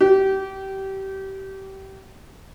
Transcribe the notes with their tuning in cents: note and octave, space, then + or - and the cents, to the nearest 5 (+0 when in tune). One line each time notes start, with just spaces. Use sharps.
G4 -25